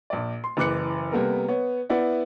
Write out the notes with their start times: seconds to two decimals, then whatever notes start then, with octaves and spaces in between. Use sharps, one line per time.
0.10 A#1 D5
0.44 C6
0.57 F#1 E3 D6 F#6 C#7
1.12 C3 G3 A#3 B3 A4 A#4
1.48 B3 C#5
1.90 B3 E4 D5 F#5